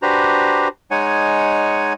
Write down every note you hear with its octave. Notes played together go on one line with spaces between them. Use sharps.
D4 F#4 G4 B4 C5 A#5
G#3 D#4 C#5 F#5 G#5